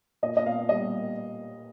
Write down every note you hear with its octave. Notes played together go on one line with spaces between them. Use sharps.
A#2 D#5
D#5
A#2 F5
G3 D#5